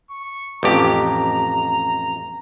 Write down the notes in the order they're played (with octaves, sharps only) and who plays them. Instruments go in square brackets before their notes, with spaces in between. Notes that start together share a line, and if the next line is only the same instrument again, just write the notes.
[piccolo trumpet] C#6
[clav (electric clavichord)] A1 F2 G4 [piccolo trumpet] A#5